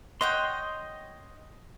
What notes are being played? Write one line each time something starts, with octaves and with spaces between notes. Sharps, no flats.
C#5 D#5 F#5 G5 C6